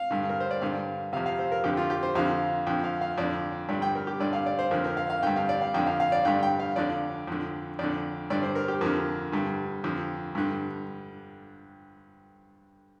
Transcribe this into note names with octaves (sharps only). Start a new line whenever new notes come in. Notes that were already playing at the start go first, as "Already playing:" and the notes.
Already playing: F5
G2 D3
A#4
C5
D5
G2 D3 F5
F2 C3 F5
F5
C5
A#4
F2 D3 G4
F4
G4
C5
F2 D3 F5
F2 D3 G5
F5
F5
F2 D3 D5
G2 D3 D5
G5
A#4
G4
G2 D3 D5
F5
D5
C5
F2 D3 A#4
A#4
F5
F5
G2 D3 G5
F5
D5
F5
F2 D3 G5
F5
F5
D5
G2 D3 G5
G5
F5
F2 D3 D5
F2 D3
F2 D3 D5
G2 D3 D5
C5
A#4
G4
F2 D3 A#4
G2 D3
F2 D3
G2 D3